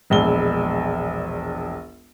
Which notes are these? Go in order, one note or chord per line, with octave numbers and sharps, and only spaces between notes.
E1 A#1 G#3 G7